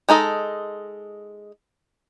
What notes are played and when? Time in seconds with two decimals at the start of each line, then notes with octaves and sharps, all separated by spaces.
0.09 G#3 D#4 A4 D#5